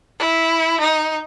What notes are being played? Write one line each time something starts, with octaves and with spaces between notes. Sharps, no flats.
E4
D#4